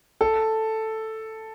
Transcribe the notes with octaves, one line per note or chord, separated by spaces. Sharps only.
A4